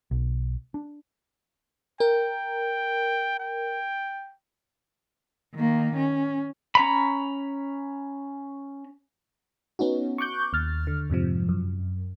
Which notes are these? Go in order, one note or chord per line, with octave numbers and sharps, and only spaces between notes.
B1
D4
A#4 G5
G5
D#3 A#3
C#4
C#4 A#5 B5
B3 C#4 D#4 F#4
C#6 D6 F#6 G6
D#2 F6 A6
D3
F2 G#2 C3 F3
F#2